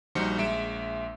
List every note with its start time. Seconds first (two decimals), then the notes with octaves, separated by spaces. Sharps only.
0.15 A#1 G3 D#4 F#4 C5 C#7
0.38 A#1 G#3 E5 D7 E7